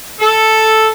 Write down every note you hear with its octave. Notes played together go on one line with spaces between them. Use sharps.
A4